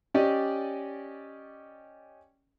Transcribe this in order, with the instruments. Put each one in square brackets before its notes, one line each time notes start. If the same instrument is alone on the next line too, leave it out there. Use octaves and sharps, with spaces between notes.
[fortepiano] C#4 G4 D5 D#5